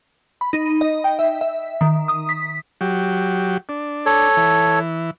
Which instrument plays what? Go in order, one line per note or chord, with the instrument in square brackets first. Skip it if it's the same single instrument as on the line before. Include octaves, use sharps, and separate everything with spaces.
[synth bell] B5
D#4
D#5
G5
E5
E5
D#3
D#6
B6
[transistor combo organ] F#3 G4
D4
[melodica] A4 C#5
[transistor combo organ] E3